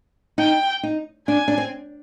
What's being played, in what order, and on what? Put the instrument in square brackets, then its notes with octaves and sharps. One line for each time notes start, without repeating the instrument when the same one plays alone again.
[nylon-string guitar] D#4 [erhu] G5
[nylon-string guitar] D#4
[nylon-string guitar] D4 [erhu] G#5
[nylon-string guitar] D4
C4